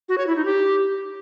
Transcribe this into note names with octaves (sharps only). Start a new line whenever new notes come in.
F#4
C#5
E4
D#4
G4